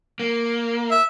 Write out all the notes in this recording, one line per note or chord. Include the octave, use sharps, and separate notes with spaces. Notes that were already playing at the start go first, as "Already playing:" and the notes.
A#3
E5